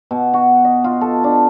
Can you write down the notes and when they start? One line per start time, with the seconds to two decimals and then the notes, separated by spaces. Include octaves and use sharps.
0.11 B2
0.34 F#4
0.65 D#5
0.84 F4
1.01 A4
1.24 D4